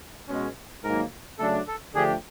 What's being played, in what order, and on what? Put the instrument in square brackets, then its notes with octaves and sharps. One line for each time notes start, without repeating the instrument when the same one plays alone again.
[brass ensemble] B2 G#3 C#4
[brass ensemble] G#2 D#3 F#3 A#3 D#4 [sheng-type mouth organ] A#4
[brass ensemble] C#3 F#3 A3 D4 [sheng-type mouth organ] A4
[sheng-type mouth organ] A4
[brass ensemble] D3 F3 A3 D4 G4 [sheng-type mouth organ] G#4